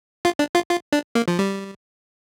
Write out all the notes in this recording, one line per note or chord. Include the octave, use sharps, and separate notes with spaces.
F4
D4
F4
F4
D4
A#3
F3
G3